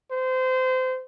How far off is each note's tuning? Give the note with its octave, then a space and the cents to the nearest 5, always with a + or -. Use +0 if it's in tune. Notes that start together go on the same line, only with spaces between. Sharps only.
C5 -25